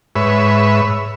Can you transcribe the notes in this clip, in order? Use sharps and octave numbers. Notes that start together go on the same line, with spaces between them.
G#2 B4 C#5 E5